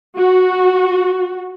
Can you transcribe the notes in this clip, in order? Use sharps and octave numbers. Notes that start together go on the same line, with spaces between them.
F#4